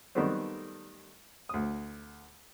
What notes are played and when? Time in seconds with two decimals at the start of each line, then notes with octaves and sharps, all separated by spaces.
0.15 D#3 F#3 G3 A3 B3 C4
1.49 D2 D#6